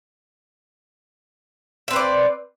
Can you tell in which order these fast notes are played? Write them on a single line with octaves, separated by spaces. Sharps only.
E5 C4 B4 D5